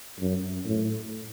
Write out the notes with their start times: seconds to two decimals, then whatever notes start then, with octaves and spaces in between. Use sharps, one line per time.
0.20 F#2
0.65 A2